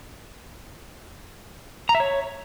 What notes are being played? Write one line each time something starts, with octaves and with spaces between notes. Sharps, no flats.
A#5
E5
C#5